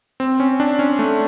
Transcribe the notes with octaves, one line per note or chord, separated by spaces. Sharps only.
C4
C#4
D4
C#4
A3